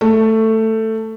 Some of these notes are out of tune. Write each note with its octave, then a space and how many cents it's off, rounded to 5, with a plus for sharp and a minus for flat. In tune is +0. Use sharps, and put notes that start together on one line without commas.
A3 +10